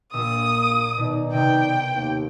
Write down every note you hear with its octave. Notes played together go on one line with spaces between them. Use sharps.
A#1 A#2 A#3 D#6 E6
B2 D#3 D#4 D5
C3 B3 G5
D#2